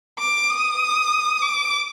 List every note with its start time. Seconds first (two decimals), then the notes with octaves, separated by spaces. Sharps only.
0.19 D6
0.50 D#6
1.42 D6